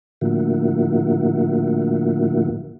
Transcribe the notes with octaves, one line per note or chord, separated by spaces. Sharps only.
A2 D3 F3 A#3 E4 F#4